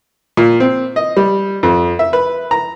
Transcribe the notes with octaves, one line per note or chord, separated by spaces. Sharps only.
A#2
C4
D#5
G3
F2
E5
B4
A#5